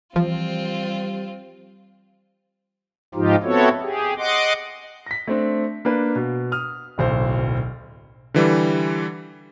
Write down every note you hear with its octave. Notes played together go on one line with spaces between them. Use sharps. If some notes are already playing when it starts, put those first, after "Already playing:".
E3 F3 G3 C4 F4
G#2 F3 D#4 F4 G4
B3 C4 E4 F#4 A4 C#5
G4 G#4
D#5 F#5 C6 D6
A#6 B6
A3 C4 D4
A#3 D4 B4
B2
D#6 F6
D1 B1 C5
D3 E3 G3